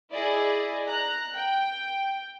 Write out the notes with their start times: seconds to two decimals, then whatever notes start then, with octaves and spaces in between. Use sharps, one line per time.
0.12 E4 G#4 D5 D#5
0.87 A#5 F#6
1.35 G5